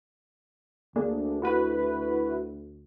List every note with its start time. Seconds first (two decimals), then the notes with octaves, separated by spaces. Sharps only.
0.96 D2 A#3 D4 G#4
1.42 E4 F#4 B4